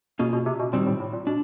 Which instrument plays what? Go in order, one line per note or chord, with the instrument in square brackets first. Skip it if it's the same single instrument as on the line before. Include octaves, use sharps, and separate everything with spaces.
[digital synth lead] B2 [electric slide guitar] A#3 C#4 F4 G#4
[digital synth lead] B2
C3
B2
[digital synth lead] A#2 [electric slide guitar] D#3 G3 C4
[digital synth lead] A2
A2
A#2
[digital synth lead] B2 [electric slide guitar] D4